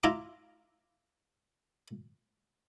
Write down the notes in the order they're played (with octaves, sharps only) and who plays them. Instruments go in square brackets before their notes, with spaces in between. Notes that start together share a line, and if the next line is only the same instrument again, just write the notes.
[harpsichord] E4 F4 A#5 D6